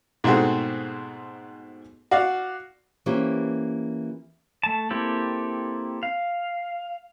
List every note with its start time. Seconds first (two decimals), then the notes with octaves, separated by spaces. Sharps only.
0.24 G#2 B2 A3 C4 F#4 G#4
2.11 F#4 D5 F5
3.06 E3 A#3 C#4 G4 C5
4.63 A3 A5
4.90 A#3 C4 E4 G4 A4
6.03 F5